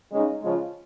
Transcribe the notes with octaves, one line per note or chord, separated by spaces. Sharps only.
C#3 G#3 D#4
C#3 F3 G#3 C#4 F4